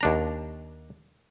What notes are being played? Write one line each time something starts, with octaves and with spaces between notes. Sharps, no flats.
D#2 D4 A#5